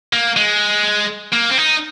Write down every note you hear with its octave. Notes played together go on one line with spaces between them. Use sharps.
A#3
G#3
A#3
C4
D#4